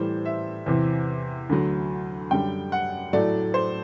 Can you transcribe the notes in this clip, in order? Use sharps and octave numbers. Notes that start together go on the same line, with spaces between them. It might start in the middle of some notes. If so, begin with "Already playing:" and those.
Already playing: A2 E3 G3 C5
E5
E2 C3 E3
D2 D3 F#3
F#2 D3 G3 G5
F#5
A2 F#3 A3 D5
C5